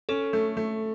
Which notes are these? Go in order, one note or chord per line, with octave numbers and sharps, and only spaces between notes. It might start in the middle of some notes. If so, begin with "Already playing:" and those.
C#4 A4
A3
A3